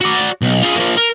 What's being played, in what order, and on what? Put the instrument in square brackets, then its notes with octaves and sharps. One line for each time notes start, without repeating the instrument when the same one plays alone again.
[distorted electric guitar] F#4 D5
B1
F4 G#4
F3 A#3
A#4